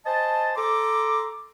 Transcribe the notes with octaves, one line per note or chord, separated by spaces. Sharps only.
C5 D#5 G#5 A5
A4 A#5 C6 D6